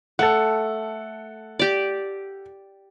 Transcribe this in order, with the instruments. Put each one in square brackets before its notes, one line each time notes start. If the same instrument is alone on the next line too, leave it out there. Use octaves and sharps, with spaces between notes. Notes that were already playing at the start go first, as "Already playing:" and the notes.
[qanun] A3 [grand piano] A4 F#5
[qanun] G4 D5